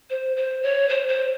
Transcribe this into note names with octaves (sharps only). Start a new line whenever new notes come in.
C5
C5
C#5
C5
C5